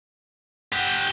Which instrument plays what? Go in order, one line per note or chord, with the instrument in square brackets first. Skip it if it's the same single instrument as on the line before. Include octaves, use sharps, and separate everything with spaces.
[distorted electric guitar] G4 F#5 [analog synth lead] G6